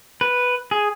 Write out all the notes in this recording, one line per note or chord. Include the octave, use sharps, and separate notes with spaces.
B4
G#4